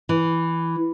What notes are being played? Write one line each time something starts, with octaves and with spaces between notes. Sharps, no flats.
E3